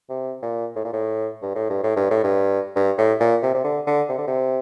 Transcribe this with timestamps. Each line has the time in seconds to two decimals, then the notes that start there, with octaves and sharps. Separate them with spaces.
0.10 C3
0.43 A#2
0.76 A2
0.85 A#2
0.93 A2
1.43 G2
1.56 A2
1.70 G2
1.83 A2
1.97 G2
2.11 A2
2.24 G2
2.76 G2
2.98 A2
3.20 A#2
3.43 C3
3.54 C3
3.64 D3
3.87 D3
4.09 C3
4.18 D3
4.28 C3